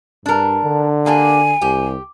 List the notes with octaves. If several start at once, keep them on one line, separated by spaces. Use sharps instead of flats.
G2 D4 A#4
D3
A#3 D4 G4 G#5
C2 G4